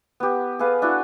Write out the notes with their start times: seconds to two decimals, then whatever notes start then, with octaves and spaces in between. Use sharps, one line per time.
0.20 B3 G4
0.59 G#4 A4 B4 F5
0.82 D4 E4 F#4